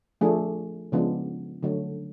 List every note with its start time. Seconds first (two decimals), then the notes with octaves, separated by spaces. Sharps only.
0.21 F3 A3 D4 G#4
0.92 C#3 F3 G#3 B3 D4
1.63 D3 F#3 A3